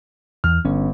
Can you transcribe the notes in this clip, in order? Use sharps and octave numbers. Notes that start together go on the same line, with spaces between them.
E2 F6
G1 C#4